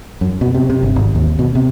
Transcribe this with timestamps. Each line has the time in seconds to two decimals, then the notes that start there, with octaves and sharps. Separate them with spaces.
0.21 F#2
0.41 B2
0.55 C3
0.70 C3
0.83 G1
0.96 G#1
1.15 D#2
1.39 B2
1.55 C3